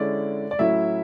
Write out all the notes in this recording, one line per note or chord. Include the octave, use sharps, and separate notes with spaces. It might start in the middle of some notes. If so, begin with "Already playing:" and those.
Already playing: D3 G#3 C#4 E4 D5
D5
A2 F#3 C#4 E4 E5